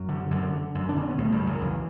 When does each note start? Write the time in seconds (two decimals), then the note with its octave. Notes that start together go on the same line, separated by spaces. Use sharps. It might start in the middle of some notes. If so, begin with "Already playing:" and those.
Already playing: F#2 F#3
0.09 D3
0.31 F#2 D3
0.53 D3
0.75 F#2
0.89 D4
0.96 D3 C#4
1.08 B3
1.18 C#2 A2 A3
1.32 G2 G3
1.40 C#3
1.46 F#2 F#3
1.61 C#2 E3